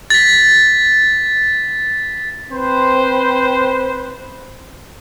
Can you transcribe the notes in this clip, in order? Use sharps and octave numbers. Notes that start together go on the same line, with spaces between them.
A6 B6
C4 B4 C5